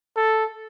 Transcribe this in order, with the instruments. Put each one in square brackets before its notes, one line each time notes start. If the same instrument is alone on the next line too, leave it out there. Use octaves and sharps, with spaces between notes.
[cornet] A4